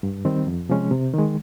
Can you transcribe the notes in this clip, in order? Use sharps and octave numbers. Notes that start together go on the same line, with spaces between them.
G2
D#3 G3 C4
F2
C3 F3 G#3 C#4
C3
D#3 G#3